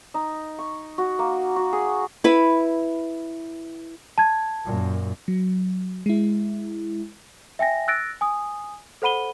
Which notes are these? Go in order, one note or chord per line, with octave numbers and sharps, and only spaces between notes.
D#4
C#6
F#4
A#3
F#4
G#4
E4 B4
A5 G#6
F#2 A#2
F#3
G#3 E4
E5 G5 G#5 A#6
E6 F#6 A6 A#6 D7
G#5 D#6
A4 C5 F#5 B5 D#7 G7